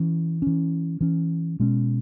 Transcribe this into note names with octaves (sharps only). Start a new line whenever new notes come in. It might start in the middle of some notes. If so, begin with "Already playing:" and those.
Already playing: E3 C#4
E3 C#4
E3 C#4
B2 G#3 C#4